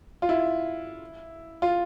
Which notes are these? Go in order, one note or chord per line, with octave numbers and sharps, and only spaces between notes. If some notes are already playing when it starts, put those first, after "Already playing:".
F4
E4
F4